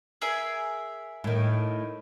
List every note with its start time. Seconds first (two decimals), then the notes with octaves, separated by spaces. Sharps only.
0.22 G#4 A#4 E5
1.24 A2 D#3